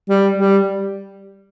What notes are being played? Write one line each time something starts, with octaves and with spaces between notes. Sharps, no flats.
G3
G3